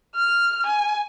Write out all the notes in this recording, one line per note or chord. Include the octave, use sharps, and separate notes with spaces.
F6
G#5